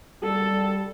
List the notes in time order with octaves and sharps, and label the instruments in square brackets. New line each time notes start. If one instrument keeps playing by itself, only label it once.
[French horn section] G3 [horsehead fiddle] A4